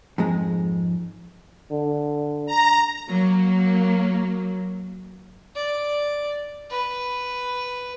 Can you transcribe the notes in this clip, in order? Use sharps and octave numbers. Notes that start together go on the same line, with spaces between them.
F2 G#2 G#3
D3
A#5
F#3 A#3
D5
B4